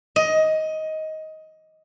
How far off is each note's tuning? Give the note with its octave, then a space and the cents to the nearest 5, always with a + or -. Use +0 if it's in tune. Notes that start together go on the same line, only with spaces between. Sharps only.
D#5 +15